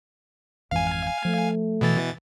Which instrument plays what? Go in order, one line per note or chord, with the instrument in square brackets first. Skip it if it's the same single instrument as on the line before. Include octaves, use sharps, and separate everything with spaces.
[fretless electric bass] G#1 F2 E3 [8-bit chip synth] F5 G#5
[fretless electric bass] F3 [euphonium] A3
[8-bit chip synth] B2 E3 A6